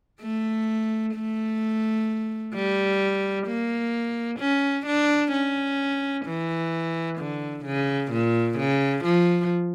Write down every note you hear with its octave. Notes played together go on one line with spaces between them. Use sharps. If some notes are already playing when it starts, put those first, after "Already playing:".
A3
A3
G3
A#3
C#4
D4
C#4
E3
D3
C#3
A#2
C#3
F3